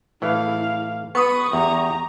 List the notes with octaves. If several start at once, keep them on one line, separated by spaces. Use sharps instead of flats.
A2 E3 E4 F5
B3 B4 C#6 D#6
E2 G4 A#5